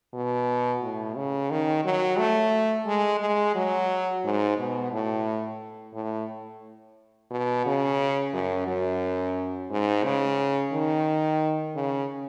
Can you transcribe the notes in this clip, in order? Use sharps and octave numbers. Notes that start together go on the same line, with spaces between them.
B2
A2
C#3
D#3
F#3
A3
G#3
G#3
F#3
G#2
B2
A2
A2
B2
C#3
F#2
F#2
G#2
C#3
D#3
C#3